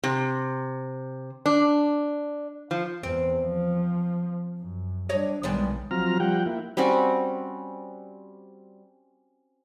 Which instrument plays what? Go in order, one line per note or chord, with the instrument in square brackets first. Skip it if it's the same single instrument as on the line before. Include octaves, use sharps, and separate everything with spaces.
[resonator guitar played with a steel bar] C3
D4
F3
[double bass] E2 [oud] C4
[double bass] F3
F#2
[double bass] G3 D4 [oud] C#5 D#5
[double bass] B1 D#3 [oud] G3 G#3 B3
[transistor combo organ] F3 F#3 C4 A#5 F6
F3 G3 F#5 G5
A#3 E4
[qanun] G3 C4 C#4 F#4